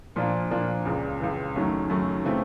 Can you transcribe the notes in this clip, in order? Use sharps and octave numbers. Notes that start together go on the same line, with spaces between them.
A#2 F3 A#3 D4 F4
A#2 F3 A#3 D4 F4
C#2 C#3 E3
C#2 C#3 E3
F#2 D#3 F#3 A3 C#4
F#2 D#3 F#3 A3 C#4
C#3 E3 A3 C4